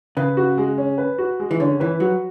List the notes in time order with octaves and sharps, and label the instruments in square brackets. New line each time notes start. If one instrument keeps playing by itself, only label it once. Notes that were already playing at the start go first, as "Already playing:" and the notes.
[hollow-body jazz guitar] C#3 [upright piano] B4
[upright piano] F#4
G#3
C#4
B4
F#4
G#3
[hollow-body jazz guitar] E3
[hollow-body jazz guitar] D3 [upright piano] C#4
[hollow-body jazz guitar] E3 [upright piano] B4
[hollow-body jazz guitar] F#3 [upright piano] F#4